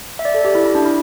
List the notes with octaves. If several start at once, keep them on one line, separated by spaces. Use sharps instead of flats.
E5
D5
A4
G4
E4
E4
D4
E4